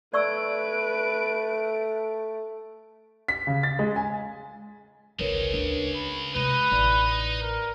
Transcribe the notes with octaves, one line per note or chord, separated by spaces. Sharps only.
A3 B4 D5 C#6 E6 D7
B6
C#3
A6
G#3
G#5
G#1 C#2 C#3 G#3 A#4 B4 C#5
D2 D4
B5
C3 G#3 D#4 B4 D#5
A1 D5
A#4